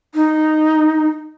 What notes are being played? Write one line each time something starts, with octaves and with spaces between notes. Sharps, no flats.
D#4